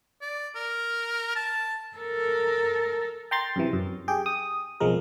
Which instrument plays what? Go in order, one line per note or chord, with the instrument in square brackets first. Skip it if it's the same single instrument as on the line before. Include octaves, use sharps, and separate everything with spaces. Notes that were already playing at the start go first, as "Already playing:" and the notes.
[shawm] D5
A#4
A5
[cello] A4 A#4
[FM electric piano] G5 A#5 C6 A6
F#2 C3 E3
F#2
G4 G#4 G5
D#6
B1 F2 F3 G#3 A#4